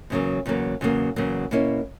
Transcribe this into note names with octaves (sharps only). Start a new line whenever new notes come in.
E2 C#3 F#3 A#3
E2 C#3 F#3 A#3
E2 C#3 F#3 A#3
E2 C#3 F#3 A#3
B2 A#3 C#4 E4